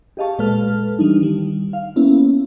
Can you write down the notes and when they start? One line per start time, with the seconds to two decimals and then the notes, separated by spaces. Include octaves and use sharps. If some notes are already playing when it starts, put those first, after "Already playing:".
0.17 G4 G#4 D#5 F5 A5 C#6
0.39 A#2 G#3 A4 B4 A5 F6
0.99 E3 G3 D4 D#4
1.21 D#3 G3
1.73 F5
1.96 A#3 B3 C#4 E4